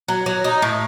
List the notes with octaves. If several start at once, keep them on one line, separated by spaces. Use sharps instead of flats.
F#3
F#3
D#4
A2